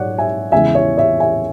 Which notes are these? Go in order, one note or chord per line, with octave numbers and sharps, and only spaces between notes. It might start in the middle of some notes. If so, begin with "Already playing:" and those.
Already playing: G#2 F#3 C#5 D5 F#5
E5 G#5
E2 C#3 E3 G#3 E5 G#5
C#5 E5
C#5 E5
E5 G#5